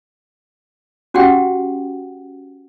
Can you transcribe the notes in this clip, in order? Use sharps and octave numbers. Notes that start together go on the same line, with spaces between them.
C#4 F#4 G4 F#5 G5